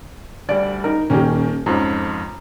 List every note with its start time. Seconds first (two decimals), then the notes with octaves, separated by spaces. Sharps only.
0.49 D2 G3 D5
0.84 D#4 A#4
1.10 D#1 D#3 A#3 C#4 G4
1.66 F2 G#2 F3 C#4 A#5